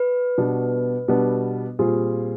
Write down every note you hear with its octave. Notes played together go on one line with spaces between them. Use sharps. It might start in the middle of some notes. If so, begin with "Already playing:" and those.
Already playing: B4
B2 G3 B3 D4 F#4
B2 G3 B3 D4 F#4
A#2 G3 C4 F4 G#4